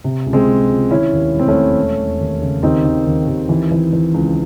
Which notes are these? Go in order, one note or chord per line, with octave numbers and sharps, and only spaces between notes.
C3
C#2
G#3 C4
C#2
C#2
D#3 C#4 E4
D#2
E1
C4
A3 C#4
E1
E1
E1
D#2
C#3
D#2 C4 D#4
D#3
D#2
D#2
E3
E3
E3
C#2